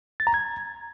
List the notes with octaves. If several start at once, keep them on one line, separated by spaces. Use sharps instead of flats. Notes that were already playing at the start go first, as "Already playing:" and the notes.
A6
A#5
G#6